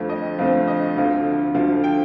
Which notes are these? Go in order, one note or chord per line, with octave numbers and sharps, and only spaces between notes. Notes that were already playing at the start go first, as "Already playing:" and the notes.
Already playing: F2 D3 F3 A3 C4
D#5
F2 D3 F3 A3 C4 F5
D#5
D2 D3 F3 F5
D2 D3 F3 F5
G5